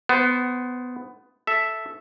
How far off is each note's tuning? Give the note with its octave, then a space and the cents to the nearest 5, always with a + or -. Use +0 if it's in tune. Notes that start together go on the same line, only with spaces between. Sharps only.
B3 +15 C5 +0
A4 +0 E5 +0